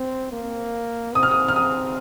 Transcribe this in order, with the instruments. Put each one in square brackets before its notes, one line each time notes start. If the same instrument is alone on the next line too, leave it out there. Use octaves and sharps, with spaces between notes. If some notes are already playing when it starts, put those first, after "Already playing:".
Already playing: [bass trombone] C4
A#3
[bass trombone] C4 [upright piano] D#6
[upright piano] F6
D#6
F6
D#6